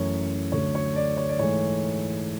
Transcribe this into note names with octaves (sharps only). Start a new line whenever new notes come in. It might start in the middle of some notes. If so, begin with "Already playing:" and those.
Already playing: F#2 E3 A3 C#5
D2 D3 F#3 A3 C#5
C#5
D5
C#5
D5
G#2 E3 A3 C#5